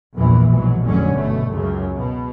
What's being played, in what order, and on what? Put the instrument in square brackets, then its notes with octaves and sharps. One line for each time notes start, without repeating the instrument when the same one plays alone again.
[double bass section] A#1 E2 G2 A#2 E3
G#2 B2 E3 F#3
F1 G#2 D3 F#3 C#4
G1 B2 A3
C#2 F#2 C#3
B2